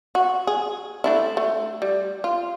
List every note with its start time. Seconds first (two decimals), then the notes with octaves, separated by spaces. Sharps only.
0.15 F#4
0.47 G#4
1.04 A3 D4 E4
1.37 A3
1.82 G3
2.24 F4